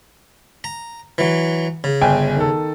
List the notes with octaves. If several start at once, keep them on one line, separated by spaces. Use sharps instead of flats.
A#5
E3 F#3
C#3
G1 G5 G#5
D#3 A4